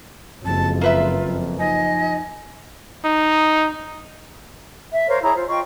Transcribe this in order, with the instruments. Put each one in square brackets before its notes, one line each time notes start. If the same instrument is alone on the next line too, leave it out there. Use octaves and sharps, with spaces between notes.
[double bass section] F#1 [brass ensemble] F2 G#3 [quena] A5
[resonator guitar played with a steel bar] A#3 B4 E5 [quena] F4
[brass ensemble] F2
[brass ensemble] F3 D#4 G#5 [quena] D#5
[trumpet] D#4
[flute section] E5
A#4 C5 C#5 F5
E4 G#4 C#5 A#5
F4 C5
F4 D#5 G5 C#6